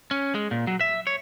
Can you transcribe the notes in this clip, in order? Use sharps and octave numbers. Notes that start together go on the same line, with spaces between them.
C#4
G#3
A#2
F#3
E5
C#5